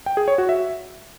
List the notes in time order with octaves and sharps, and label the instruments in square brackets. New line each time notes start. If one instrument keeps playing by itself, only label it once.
[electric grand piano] G5
G#4
C#5
F#4
E5